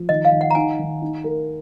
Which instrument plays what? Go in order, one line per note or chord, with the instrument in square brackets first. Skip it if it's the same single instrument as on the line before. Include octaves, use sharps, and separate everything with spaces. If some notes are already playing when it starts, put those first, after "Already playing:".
Already playing: [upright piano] F3
[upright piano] D#3 [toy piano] D#5
[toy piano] F5
[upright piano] D#3
[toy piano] F#5
A#5
[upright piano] D#4 [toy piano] G#5
[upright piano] D#3
D#4
A#4